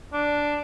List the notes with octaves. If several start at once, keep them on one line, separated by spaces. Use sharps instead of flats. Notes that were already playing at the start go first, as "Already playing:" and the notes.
D4